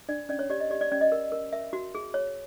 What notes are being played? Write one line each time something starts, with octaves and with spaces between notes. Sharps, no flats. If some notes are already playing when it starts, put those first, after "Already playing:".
D4 D5
C#4 D5
C#5
G4 D5
D#5
G4 D5
D5
C#4 D5
D#5
A#4
A#4
A#4 E5
F#4
G#4
C#5